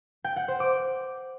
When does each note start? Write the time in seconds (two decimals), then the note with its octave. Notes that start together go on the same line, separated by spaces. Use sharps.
0.24 G5
0.36 F#5
0.48 C5
0.60 D6